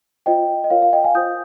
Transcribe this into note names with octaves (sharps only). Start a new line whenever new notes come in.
F4 C5 D#5 G5
D#5
F4 A#4 C#5 F5
F5
D#5 G5
F5 G#5
F4 C5 D#6 G6